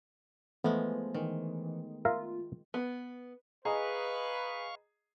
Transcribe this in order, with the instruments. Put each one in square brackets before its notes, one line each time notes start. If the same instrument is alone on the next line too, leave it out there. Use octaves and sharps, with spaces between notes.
[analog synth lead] E3 [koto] F3 G#3 [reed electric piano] A3 B3
[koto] D#3 [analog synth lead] E3
[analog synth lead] F4 [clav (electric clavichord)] A#4 E5 F5
[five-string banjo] B3
[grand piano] G#4 [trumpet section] B4 [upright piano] D#5 A#5 [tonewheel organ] F5 C#6